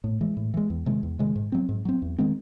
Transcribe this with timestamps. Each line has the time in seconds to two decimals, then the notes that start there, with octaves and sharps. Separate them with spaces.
0.04 A2
0.21 E3 G#3
0.37 A2
0.54 E3 G#3
0.70 E2
0.86 C3 D#3 G#3
1.03 E2
1.19 C3 D#3 G#3
1.35 G#2
1.52 F#3 C4
1.69 G#2
1.85 F#3 C4
2.02 E2
2.18 D#3 G#3 C4